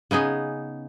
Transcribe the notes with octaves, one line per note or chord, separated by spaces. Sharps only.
C#3 B3 D#4 G#4